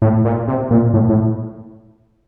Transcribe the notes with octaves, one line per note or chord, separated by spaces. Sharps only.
A2
A#2
C3
A#2
A2
A2